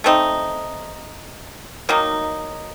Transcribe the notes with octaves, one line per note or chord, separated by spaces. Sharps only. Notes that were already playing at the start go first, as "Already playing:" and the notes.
A3 C4 D#4
D#3 F#3 A#3 D#4